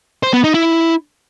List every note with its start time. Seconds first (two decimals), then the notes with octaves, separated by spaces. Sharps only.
0.23 C5
0.33 B3
0.44 D#4
0.54 E4